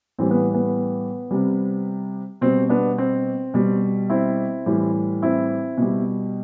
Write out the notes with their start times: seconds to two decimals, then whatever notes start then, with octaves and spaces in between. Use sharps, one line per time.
0.18 A2 E3 G3 C4
0.31 B3
0.54 B3
1.31 C3 G3
2.41 B2 G3 C4
2.69 B3 D4
2.98 C4
3.54 B2 G3
4.10 C4 E4
4.66 A2 E3 G3
5.22 C4 E4
5.78 B2 G3